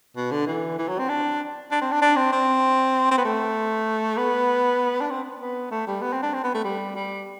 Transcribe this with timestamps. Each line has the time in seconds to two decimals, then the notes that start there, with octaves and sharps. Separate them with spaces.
0.16 B2
0.31 D3
0.47 E3
0.79 E3
0.89 F#3
0.99 C4
1.09 D4
1.71 D4
1.81 C4
1.92 D4
2.02 D4
2.16 C4
2.32 C4
3.11 C4
3.18 B3
3.25 A3
4.17 B3
5.01 D4
5.10 C4
5.40 B3
5.71 A3
5.87 G3
6.02 B3
6.13 C4
6.23 D4
6.34 C4
6.44 B3
6.54 A3
6.64 G3
6.96 G3